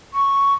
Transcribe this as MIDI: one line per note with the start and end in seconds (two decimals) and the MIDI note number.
0.13 0.53 85